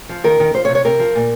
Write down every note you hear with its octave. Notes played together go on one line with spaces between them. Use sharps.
F3
D#3 A#4
D#3
F3 C5
C#5
C3
C#5
C3 A#4
F3
A#2